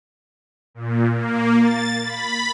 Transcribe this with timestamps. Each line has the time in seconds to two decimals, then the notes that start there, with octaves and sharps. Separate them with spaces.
0.75 A#2
1.12 A#3
1.60 A6
2.04 B5